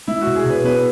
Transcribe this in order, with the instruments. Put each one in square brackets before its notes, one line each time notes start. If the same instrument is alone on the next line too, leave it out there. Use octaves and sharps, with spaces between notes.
[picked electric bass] G#3 [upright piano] E4
[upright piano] F#4
[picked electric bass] B2
[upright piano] G#4
[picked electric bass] B2 [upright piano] B4
[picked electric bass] B3 [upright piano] B4